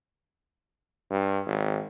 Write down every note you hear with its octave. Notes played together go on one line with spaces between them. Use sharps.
G2
G#1